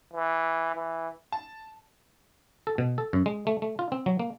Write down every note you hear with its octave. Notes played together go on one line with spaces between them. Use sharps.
E3
E3
A5
A4
B2
A4
F#2
G#3
A3
A3
F4
C4
F#3
A#3